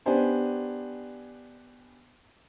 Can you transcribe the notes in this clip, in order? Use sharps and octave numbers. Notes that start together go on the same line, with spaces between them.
B3 D4 G4 C5 G#5